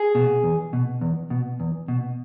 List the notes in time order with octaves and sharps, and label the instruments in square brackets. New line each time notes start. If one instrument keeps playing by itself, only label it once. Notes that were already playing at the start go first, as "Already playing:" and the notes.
Already playing: [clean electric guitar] G#4
B2
E2
B2
E2
B2
E2
B2